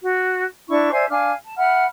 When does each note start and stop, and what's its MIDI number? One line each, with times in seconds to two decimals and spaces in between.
0.02 0.43 66
0.68 0.88 62
0.68 0.88 64
0.68 0.88 85
0.91 1.04 72
0.91 1.04 74
0.91 1.04 76
0.91 1.04 80
1.09 1.31 62
1.09 1.31 77
1.09 1.31 80
1.09 1.31 89
1.45 1.55 81
1.57 1.84 76
1.57 1.84 78
1.57 1.84 83
1.57 1.84 89